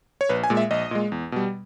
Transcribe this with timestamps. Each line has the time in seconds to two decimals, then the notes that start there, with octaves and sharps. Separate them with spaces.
0.21 C#5
0.29 A#1 B4
0.44 G#5
0.50 A#2 G#3
0.57 E5
0.71 A#1 D#5
0.91 A#2 G#3
1.12 E2
1.32 B2 G3